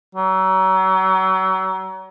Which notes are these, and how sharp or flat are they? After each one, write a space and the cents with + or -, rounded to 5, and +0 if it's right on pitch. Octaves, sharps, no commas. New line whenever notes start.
F#3 +35